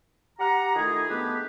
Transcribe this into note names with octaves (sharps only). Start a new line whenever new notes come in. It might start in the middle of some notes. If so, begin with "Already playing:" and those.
G4 F#5 A#5
D#3 A3 E4 F4 G#4
G#3 A3 B3 D4 G4 B4